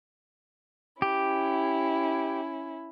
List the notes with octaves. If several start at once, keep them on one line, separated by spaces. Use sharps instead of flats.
C#4 E4 G4